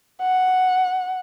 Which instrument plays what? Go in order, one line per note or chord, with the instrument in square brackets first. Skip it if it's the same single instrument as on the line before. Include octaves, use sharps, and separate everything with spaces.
[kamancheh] F#5